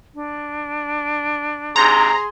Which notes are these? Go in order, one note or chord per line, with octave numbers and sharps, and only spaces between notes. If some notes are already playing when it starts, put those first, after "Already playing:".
D4
G#2 C3 G#4 A#5 C6